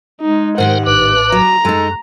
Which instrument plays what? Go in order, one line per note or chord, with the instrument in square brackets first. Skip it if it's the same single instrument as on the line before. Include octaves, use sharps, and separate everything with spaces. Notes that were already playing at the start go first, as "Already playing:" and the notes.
[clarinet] G#3 [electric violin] D#4
[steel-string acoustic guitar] G#2 D#3 G4 [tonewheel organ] A#4 C5 [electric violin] F#5
[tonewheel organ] A1 A2 B4 [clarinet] D6 [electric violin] F#6
[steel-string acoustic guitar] F#3 [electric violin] A#5
[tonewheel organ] F#2 [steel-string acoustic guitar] G#3 D#4 [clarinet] A4